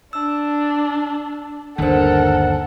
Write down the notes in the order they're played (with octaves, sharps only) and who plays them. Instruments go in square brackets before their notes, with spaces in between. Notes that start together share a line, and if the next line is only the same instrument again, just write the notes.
[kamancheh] D4 [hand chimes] E6
[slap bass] G1 D#2 [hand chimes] D4 C5 [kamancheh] A4 A#4 [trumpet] F#5